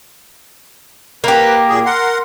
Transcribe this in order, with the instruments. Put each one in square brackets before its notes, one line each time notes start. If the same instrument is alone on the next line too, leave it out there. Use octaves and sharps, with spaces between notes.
[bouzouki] A#3 G4 [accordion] B4
[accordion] A#2 G#4
A#4 F#5 C6